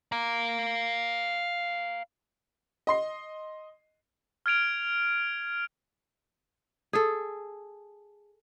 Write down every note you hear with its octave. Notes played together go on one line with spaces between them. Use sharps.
F5 A#5
D#5 C6 C7
F6 G#6 D7 F7
G#4 A4